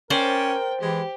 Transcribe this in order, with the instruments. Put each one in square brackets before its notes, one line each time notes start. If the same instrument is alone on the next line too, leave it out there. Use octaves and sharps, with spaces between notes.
[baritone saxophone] C#4 [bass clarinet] A#4 [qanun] C5 D5 [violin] G5
[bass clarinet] E3 [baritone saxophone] G#3 [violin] G4